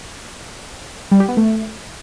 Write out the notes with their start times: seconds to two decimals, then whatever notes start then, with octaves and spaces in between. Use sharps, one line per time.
1.11 G3
1.20 G4
1.28 B3
1.37 A3